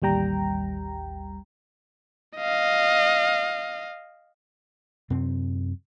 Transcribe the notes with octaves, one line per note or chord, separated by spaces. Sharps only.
A1 D#2 G3 G5 A#5
D#5 F5
F#2 C3 C4